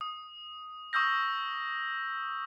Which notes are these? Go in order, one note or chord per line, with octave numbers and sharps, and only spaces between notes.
D#6
C#6 D#6 E6 G6 A#6